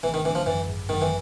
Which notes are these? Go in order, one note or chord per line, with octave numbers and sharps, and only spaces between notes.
G#1 E3
D#3
D3 E3
F3
F#2 E3
G#1
F#2 D#3
E3